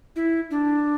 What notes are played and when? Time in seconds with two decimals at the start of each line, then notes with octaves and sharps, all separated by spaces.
0.16 E4
0.51 D4